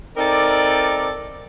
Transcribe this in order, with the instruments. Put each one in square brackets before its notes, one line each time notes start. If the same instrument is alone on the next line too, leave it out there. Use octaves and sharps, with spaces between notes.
[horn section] C4 D#4 A4 A#4 D5